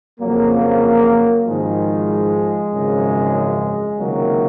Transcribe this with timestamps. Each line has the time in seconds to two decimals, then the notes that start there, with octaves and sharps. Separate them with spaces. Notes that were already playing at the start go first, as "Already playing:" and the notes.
0.20 F2 C#3 F3 F#3 A#3
1.46 G#1 G#2 D#3 F3 G#3
2.72 G#1 F#2 C#3 F3
3.98 C#2 C3 D#3 F#3 A#3